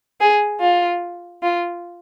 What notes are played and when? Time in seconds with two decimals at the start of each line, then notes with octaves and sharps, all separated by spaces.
0.21 G#4
0.61 F4
1.43 F4